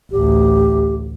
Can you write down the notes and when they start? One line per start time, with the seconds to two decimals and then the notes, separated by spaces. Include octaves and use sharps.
0.12 A1 D2 G4